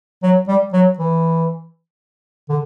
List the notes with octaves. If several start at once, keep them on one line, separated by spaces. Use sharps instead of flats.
F#3
G3
F#3
E3
D3